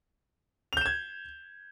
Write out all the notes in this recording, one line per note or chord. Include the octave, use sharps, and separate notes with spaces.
G6 G#6 E7 F7